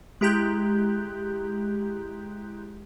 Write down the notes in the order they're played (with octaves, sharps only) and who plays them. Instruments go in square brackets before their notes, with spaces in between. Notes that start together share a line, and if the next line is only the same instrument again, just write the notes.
[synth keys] G#3 E4 G4 A#5 F#6 G6